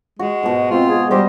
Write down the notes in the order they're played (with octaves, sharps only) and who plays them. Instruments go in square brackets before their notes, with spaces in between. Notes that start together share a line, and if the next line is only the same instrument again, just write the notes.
[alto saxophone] G#3 [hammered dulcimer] F#4
[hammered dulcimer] G#2 B2
[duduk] C4 [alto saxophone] F4
[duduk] G#4
[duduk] G3 [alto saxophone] G4 [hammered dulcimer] C5 D#5